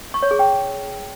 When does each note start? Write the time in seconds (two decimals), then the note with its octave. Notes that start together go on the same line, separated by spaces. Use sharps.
0.14 C#6
0.22 C#5
0.31 G#4
0.39 G5